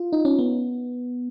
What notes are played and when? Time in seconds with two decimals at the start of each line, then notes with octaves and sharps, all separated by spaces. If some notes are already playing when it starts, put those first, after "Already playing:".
Already playing: F4
0.13 D#4
0.25 C#4
0.39 B3